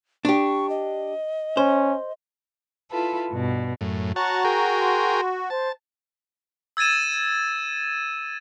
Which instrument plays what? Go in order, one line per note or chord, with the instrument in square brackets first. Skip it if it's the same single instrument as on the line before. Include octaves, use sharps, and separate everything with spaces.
[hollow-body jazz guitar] D4 G4 [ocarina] C#6
[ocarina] D#5
[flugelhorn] C#4 [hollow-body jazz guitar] C5
[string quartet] E4 F4 A4 B4
G2 B2
[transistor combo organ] F#2 A2
[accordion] F#4 [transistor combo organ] C#5 F#5 A5 [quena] A#5
[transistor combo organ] G#4 A#4 G5
[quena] C6
[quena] C5 [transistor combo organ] A5
[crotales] E6 G#6 A6 D#7 E7